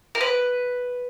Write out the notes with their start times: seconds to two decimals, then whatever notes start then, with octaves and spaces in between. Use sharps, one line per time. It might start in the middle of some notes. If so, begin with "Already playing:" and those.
0.15 A#4
0.21 B4